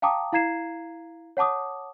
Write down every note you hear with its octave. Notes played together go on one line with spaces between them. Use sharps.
F5 G5 A5 A#5 D6 D#6
E4 F5 A#5 G#6 C7 E7
C#5 F#5 A5 D6 D#6